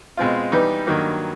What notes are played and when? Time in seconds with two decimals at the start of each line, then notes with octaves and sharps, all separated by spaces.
0.17 B2 G#3 C4 F4
0.52 E3 G3 B3 D#4
0.87 G2 D#3 F#3 A#3